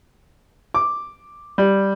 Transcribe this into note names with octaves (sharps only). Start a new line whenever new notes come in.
D6
G3